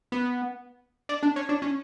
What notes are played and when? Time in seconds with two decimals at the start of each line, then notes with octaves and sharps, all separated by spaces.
0.12 B3
1.09 D4
1.23 D4
1.36 C#4
1.49 D4
1.62 C#4